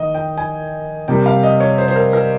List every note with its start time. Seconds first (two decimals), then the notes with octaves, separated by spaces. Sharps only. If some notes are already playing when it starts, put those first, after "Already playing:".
Already playing: D#3 A#3 D#5
0.15 G5
0.38 G#5
1.08 C3 G3 A#3 G5
1.26 F5
1.43 D#5
1.60 C#5
1.78 C5
1.88 C5
1.96 A#4
2.13 A#4